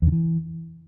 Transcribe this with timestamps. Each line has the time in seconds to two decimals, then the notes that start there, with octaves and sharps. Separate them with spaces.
0.02 E2
0.07 D3
0.12 E3